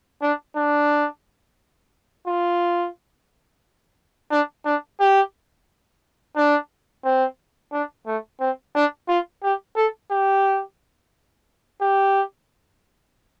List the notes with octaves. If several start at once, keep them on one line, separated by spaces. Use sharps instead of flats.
D4
D4
F4
D4
D4
G4
D4
C4
D4
A3
C4
D4
F4
G4
A4
G4
G4